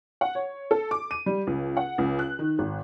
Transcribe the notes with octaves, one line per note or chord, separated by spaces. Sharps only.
F#5
C#5
A4
D6
D#7
G3
C#2
F#5
C#2
F#6
D#3
G#1